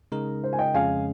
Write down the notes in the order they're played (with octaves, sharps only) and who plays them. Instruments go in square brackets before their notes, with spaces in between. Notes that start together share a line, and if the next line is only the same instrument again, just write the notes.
[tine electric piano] C#3 G#3 D#4 A#4
[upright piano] C5
G#5
D#5 G5
[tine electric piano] F2 C#3 G#3 C#4 [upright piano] F5 G#5